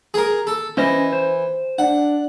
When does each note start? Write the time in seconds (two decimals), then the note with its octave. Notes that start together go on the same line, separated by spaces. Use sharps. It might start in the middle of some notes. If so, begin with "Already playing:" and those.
0.14 G#4 A#4
0.47 A4
0.77 E3 C#4 C5 D#5
1.13 C5
1.79 D4 F#5